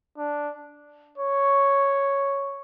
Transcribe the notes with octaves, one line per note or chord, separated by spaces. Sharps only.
D4
C#5